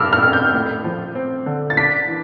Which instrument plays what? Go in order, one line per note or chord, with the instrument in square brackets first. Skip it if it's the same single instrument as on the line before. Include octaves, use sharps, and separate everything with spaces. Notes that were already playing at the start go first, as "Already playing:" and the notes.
Already playing: [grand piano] F1 G2 [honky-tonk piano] D6 E6 F6
[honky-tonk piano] F6
[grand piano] F2
[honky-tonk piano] G6
[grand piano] A2
F3
C4
D3
[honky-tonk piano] A6
[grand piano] D4 [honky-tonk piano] B6
[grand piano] E3